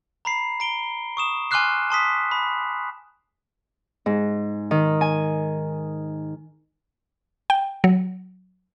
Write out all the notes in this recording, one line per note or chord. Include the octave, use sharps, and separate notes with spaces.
A#5 B5 C7
A#5 D7 G7
C#6 D#6 E7
G#5 C6 D6 F6 F#6 C7
A5 C6 D#6 B6
B5
G#2
D#3
G#5
G5
F#3